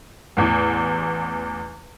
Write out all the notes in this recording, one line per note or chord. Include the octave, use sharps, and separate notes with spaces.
A1 E2